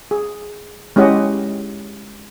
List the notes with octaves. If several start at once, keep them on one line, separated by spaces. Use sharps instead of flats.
G#4
G#3 C#4 E4 G4 D#5 F#5